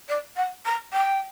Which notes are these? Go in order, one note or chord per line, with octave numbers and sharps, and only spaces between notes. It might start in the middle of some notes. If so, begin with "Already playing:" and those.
D5
F#5
A#5
G5